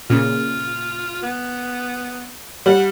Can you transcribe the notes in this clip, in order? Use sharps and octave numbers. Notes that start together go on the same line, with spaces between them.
A#2 C#3 F4
B3
G3 F#5